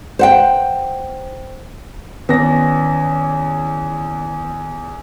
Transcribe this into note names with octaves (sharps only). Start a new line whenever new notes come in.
C5 F#5 G5
E2 D#3 B3 C#4 D5 A#6